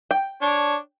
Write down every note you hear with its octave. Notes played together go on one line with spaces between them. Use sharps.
G5
D4 C#5